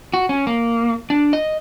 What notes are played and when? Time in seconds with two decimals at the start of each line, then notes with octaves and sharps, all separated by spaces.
0.14 F#4
0.29 C#4
0.47 A#3
1.10 D4
1.33 D#5